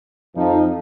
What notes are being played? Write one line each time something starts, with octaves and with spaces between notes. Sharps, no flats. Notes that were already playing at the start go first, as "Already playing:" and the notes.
F2 F3 D#4